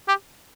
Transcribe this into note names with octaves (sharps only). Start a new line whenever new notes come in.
G4